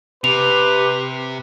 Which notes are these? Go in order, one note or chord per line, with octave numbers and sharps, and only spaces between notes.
C3 G4 B4 F7